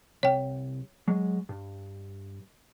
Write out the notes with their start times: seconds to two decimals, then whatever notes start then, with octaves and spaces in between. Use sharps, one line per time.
0.23 C2 C#5 G5
1.08 F#3 G#3
1.49 G2